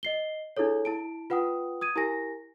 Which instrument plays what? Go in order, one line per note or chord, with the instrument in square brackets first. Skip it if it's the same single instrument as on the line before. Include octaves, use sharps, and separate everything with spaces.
[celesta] D#5 C7 G7
D4 E4 G#4 A4 C#5
E4 A5 D7
F4 B4 F#5 G5 D#6
D#6 G#6 D#7
E4 G4 A#4 G#5 A#6